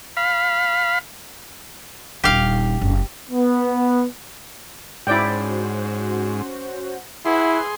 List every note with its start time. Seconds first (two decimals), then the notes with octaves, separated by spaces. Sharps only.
0.17 F5 B5
2.24 D#1 D3 G4 F5
2.81 F#1
3.30 B3
5.07 G#2 C#4 E4 F#4 C5 D5 G5
7.25 E4 G#4 B4 E5 F#5 C6